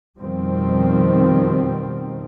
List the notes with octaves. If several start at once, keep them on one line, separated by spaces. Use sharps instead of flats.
F2 B2 D#3 F3 G3 C4